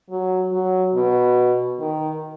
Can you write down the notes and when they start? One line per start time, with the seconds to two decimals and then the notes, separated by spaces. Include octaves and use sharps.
0.10 F#3
0.52 F#3
0.95 B2
1.79 D#3